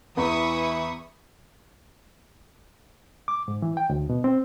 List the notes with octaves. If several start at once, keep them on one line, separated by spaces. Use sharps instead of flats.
E2 E3 E5 B5 C#6 D#6
D6
G#2
E3
G5
D2
B2
C4